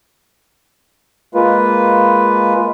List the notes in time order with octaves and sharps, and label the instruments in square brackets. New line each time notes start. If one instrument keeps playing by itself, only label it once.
[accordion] G#3 A#3 F4 B4